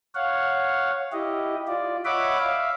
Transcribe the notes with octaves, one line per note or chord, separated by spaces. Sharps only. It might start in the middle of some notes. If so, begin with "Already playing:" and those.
C#5 F5 F#5
E4 G4 D#5
F4 D5
C#5 D#5 E5 F#5 B5 D6
E5 F5